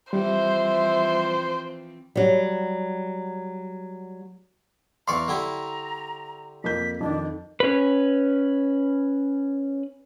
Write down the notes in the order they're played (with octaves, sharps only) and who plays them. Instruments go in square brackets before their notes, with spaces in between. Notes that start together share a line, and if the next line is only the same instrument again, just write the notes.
[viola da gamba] E3 F3 C4 [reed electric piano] G3 [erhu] C5 [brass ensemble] E5
[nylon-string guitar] F#3 G3
[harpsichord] E2 D5 F5 [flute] A#5 [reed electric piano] C6 C#6
[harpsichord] D3 G3 E4
[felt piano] F2 A#3 G6 [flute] B6
[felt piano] F2 D#3 [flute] D4
[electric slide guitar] C#4 B4